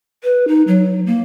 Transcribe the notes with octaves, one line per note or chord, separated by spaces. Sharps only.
B4
D#4
F#3
A#3